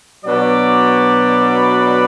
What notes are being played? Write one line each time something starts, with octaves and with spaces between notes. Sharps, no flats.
B2 F#3 D4 B4 D5